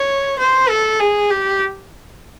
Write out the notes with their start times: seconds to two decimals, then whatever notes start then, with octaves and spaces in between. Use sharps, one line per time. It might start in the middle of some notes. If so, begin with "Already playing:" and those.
Already playing: C#5
0.39 C5
0.69 A4
1.00 G#4
1.30 G4